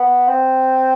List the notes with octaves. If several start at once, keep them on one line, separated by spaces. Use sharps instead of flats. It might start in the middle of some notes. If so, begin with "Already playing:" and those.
Already playing: B3
C4